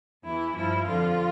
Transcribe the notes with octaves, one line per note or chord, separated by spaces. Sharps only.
E2 E3 E4
G2 F3 E4
F2 D3 F3 F4